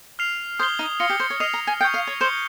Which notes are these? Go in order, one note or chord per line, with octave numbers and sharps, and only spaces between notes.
F6 C7 F7
C5 D#6 G#6 C7 G7
D#4
F4 F6 A#6 C#7 G7
G4
C5
C#5
D#5 F6 C7 F7
A#5
G#5
G5 C#6 G#6 C#7
F5
C#5
C5 G6 C#7 G7